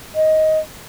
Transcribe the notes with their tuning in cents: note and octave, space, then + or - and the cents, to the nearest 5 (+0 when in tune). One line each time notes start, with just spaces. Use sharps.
D#5 +10